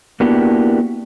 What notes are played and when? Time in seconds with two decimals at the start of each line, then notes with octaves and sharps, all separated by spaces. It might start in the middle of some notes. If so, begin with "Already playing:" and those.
0.20 A#3 B3 D4 E4 F#4 G4